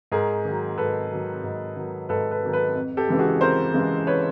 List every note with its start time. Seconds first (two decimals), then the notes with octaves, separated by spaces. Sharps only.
0.12 G#2 G#4 A#4
0.45 D#3 F#3
0.78 G#2 A4 B4
1.11 D#3 F#3
1.44 G#2
1.76 D#3 F#3
2.09 G#2 A4 B4
2.31 A4 B4
2.42 D#3 F#3
2.53 A4 B4
2.75 F2
2.97 G4 A4
3.08 C#3 E3 G#3
3.19 F#4 G#4
3.41 F2 A#4 C5
3.74 C#3 E3 G#3
4.07 B4 C#5